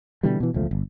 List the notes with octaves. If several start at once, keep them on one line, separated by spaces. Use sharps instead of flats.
B2 D3 E3 G3
B2 E3
E1 C#2 F3 A3
G1